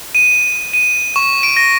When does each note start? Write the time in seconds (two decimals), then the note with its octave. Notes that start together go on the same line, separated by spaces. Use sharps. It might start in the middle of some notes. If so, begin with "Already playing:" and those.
0.15 D#7
0.73 D#7
1.16 C#6
1.43 D7
1.56 A#6